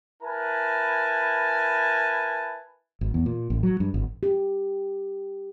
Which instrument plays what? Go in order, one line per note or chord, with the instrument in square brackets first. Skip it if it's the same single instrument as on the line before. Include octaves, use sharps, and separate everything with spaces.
[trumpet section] E4 A#4 B4 G#5 A5
[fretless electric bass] G#1
E2
A#2
A1
F#3
G2
G#1
[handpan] G4